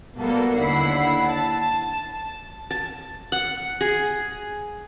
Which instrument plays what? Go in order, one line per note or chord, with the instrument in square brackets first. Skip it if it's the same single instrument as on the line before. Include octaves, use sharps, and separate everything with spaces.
[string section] B2 G3 A#3 B3 F#4 A4
D#2 D3 E4 F#5 B5 C7
A5
[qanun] A5
F#5
G#4